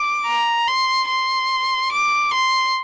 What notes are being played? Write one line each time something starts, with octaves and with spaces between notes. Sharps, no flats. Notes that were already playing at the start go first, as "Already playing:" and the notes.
Already playing: D6
A#5
C6
C6
D6
C6